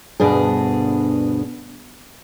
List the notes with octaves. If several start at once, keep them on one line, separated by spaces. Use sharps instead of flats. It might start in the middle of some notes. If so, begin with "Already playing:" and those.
D2 G2 B2 D4 G#4